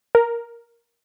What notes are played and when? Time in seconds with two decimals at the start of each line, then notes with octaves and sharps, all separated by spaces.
0.15 A#4